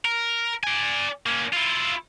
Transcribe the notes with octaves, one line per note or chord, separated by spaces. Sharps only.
A#4
D5 G#5
A#3 C#4
E4 F4